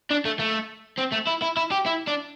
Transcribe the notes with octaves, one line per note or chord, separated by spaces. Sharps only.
D4
A3
A3
C4
A3
E4
E4
E4
G4
E4
D4